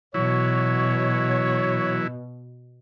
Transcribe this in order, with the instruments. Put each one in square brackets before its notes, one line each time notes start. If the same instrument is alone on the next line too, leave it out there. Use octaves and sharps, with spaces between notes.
[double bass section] B2 [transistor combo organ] E3 F#3 E4 [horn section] C#5